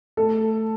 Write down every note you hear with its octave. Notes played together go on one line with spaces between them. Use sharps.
A3 A4